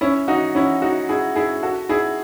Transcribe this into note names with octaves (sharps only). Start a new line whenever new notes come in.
C#4 E4
D#4 F#4
C#4 E4
D#4 F#4
E4 G#4
E4 G#4
F#4 A4
E4 G#4